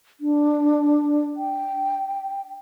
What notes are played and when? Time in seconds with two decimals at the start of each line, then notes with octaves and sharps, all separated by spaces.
0.21 D4
1.37 G5